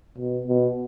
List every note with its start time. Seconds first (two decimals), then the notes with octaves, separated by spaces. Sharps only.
0.18 B2
0.48 B2